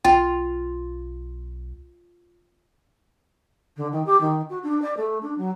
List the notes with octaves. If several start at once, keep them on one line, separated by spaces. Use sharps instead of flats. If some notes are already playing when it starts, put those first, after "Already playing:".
B1 F4 G5
D3
D#3
G4
D#3
F#4
D4
D5
A3
D4
F#3